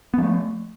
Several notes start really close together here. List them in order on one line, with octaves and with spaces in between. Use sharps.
B3 F3 A3